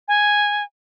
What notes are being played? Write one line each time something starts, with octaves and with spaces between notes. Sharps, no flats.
G#5